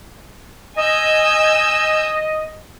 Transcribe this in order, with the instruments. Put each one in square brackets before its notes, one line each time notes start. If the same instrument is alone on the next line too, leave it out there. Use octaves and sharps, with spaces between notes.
[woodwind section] D#5 [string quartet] G#5 E6 G6